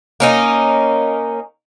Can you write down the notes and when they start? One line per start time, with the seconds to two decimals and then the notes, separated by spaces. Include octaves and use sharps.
0.20 A#3 C#4 D#4